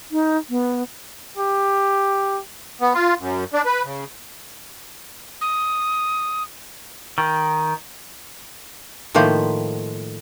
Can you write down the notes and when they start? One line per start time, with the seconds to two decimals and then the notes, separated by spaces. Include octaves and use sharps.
0.12 D#4
0.50 B3
1.37 G4
2.81 B3
2.94 F4
3.20 F#2
3.53 D4
3.66 B4
3.84 C#3
5.41 D#6
7.18 D#3
9.14 A2 D#3 F3 A#3 B4 C5